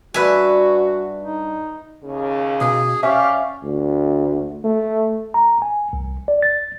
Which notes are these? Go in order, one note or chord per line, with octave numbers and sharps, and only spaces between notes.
G2 F#4 B4 D5 E5 G#5
D#4
D#2 C#3
B2 G#4
C#4 G4 D5 E5 F5
D2
A3
A#5
G#5
C2
D5
A6